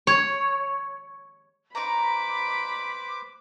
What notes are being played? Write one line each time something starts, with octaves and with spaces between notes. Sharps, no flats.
C#5
D#4 B4 C5 A#5 B5 D6